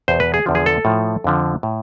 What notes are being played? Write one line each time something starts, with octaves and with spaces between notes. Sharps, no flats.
E2 B2 C5
B4
G#4
E2 D3 F3
G#4
A4
A2 F3
F2 D3 F3
A2